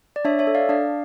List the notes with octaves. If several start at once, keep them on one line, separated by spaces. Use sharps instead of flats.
D5
D4 C#5 E5
C#5 E5
A4
D5 F5
D4 D5 F5